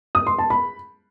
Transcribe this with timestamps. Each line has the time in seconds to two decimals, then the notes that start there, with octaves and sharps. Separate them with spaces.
0.15 D#6
0.27 C6
0.38 A5
0.50 B5